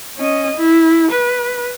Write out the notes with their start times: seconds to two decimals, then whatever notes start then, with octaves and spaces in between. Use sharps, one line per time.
0.18 C#4 D#5
0.57 E4
1.12 B4